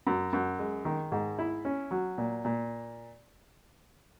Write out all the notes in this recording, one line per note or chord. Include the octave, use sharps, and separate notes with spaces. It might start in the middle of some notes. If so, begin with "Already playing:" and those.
F#2
F#2
G#3
D#3
G#2
E4
C#4
F#3
A#2
A#2